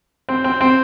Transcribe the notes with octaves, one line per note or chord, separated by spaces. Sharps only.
C4
C4
C4